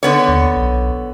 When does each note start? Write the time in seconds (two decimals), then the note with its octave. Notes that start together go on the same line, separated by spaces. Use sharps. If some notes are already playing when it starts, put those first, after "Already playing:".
0.03 D3 B3 C#5
0.28 D#2
0.56 B1